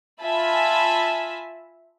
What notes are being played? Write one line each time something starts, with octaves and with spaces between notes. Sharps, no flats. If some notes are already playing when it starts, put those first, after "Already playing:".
F4 E5 G#5 A5 B5